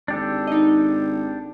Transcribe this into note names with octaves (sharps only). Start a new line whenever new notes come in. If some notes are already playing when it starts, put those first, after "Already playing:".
G#1 D4 G4 A4
D#4 D#5